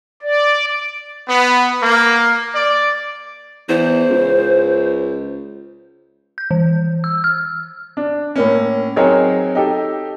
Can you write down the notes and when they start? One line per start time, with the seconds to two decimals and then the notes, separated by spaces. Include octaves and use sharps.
0.22 D5
1.28 B3
1.82 A#3
2.54 D5
3.69 E2 C5
4.10 C#2
6.38 G6
6.51 E3
7.04 E6
7.24 F6
7.97 D4
8.36 A2 A#3 C#4
8.96 F#3 C4 D#4 G#4 A#4 C#5
9.55 D#4 G4 A4